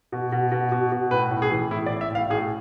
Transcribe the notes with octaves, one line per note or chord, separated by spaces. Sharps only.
B2
B2
B2
B2
B2
A2 B4
A2
G#4
E3
A2 E4
D5
A2
E5
A2 F5
A2 G#4